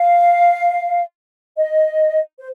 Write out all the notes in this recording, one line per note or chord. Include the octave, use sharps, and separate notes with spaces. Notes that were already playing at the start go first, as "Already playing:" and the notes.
Already playing: F5
D#5
C5